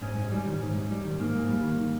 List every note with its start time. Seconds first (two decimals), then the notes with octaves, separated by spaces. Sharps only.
0.01 G#2 C#4
0.17 G#2
0.32 G3
0.46 D#3
0.61 G#2
0.76 G#2
0.91 G3
1.05 D#3
1.19 G#2 A#3
1.35 G#2
1.49 G3
1.64 D#3